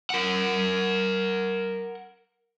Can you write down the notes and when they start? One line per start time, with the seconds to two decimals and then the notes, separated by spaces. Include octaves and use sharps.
0.10 A#4 F#5